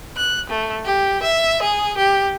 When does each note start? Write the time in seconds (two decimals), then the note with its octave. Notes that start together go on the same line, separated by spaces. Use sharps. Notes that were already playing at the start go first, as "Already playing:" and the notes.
0.17 F#6
0.49 A3
0.85 G4
1.22 E5
1.62 G#4
1.97 G4